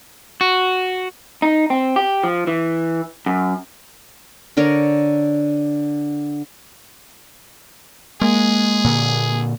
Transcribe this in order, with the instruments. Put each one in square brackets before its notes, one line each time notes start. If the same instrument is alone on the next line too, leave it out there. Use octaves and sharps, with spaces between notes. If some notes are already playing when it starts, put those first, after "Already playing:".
[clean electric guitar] F#4
D#4
C4
G4
F3
E3
F#2
[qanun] D3 D4 A#4 C#5
[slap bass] G#3 [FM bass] A#3 [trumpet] G#4
[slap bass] A#2 D3